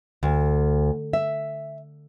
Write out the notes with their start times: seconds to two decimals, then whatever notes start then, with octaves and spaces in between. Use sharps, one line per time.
0.23 D2
1.13 E5